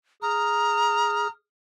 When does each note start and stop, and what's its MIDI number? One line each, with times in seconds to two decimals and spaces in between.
0.22 1.27 68
0.22 1.29 82
0.22 1.27 87
0.22 1.27 89